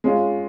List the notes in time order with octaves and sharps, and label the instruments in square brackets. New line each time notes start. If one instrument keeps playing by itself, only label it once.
[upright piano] G#3 C#4 F4